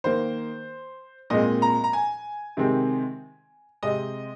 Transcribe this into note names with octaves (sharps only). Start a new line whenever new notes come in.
D#3 A#3 C5
A#2 G#3 C4 D#5
A#5
A#5
G#5
C3 D#3 G#3 C4
C3 G#3 C4 D#5